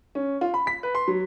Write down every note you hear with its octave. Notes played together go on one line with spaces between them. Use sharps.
C#4
F4
B5
B6
B4
C6
F#3